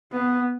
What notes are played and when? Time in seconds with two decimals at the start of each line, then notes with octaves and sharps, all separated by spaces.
0.12 B3